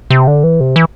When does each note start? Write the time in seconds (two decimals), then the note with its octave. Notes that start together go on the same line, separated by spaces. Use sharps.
0.10 C3
0.27 D3
0.44 E3
0.60 C3
0.76 E3